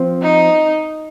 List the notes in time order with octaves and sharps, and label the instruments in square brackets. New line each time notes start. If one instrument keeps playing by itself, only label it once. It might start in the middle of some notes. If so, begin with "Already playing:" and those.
Already playing: [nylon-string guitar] F3 C4
[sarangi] D#4